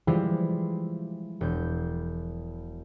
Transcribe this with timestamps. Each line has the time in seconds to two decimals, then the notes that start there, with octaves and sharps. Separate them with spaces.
0.07 E3 F3 G3 G#3 E4 F4
1.41 E1 G6